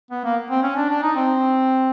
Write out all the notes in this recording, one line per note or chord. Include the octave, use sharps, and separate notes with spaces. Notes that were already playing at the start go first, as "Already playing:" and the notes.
B3
A#3
C4
C#4
D4
D4
D#4
C4